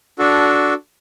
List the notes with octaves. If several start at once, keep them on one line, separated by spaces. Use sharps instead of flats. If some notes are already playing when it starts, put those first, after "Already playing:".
D4 F#4 A4